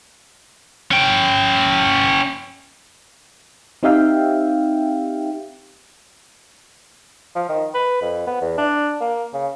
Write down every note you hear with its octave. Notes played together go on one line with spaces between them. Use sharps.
C#4 G5
C4 D#4 G4 E5 F5 G5
F3
D#3
B4
F2
B3
E2
D4
A#3
C#3